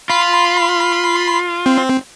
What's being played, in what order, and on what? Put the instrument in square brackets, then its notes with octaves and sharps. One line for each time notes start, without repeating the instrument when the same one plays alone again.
[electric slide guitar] F4 [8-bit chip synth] B5 C6
[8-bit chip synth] C4